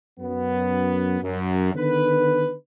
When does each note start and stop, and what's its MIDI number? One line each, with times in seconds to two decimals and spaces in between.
0.19 1.19 42
0.19 1.19 59
1.21 1.71 42
1.75 2.53 50
1.75 2.53 51
1.75 2.53 59
1.75 2.53 71